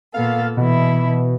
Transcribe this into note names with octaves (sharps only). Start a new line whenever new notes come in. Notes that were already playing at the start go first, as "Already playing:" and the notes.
A#2 B3 A4 F5
B2 E3 E4